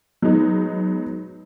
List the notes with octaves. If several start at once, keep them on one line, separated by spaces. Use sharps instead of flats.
F#3 G#3 B3 D#4